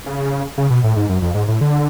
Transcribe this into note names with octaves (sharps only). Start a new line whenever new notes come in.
C#3
C#3
B2
A2
G#2
F#2
F2
G#2
A2
D3